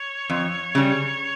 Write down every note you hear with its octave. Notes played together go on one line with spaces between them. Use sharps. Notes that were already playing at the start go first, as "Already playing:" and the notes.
Already playing: C#5
F2
C#3 G3